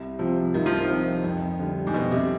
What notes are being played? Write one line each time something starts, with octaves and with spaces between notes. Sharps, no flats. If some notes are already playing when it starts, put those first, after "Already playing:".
Already playing: C2
C3 F3 C4
C2 D#3
F3
D#3
C3 F3 C4
F2
D3 G3
G#2
F2 B2
C3